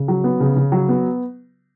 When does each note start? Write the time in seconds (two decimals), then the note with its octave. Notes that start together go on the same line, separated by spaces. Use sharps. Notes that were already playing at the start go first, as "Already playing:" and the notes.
Already playing: C#3
0.08 F#3
0.24 B3
0.40 C#3
0.56 C#3
0.72 F#3
0.89 B3